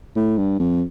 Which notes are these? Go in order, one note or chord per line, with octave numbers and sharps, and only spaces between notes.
A2
G2
F2